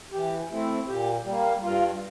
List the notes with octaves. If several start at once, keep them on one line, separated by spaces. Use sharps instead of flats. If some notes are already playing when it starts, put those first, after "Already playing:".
E3 G4
A3 C4 E4
A#2 G4
G3 A#3
G2 F4